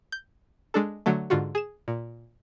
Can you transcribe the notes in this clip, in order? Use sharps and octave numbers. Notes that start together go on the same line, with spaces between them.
G6
G#3 D4 A4
D3 F#3 A3
G#2 D3 F4 F#4
G#4 E7
A#2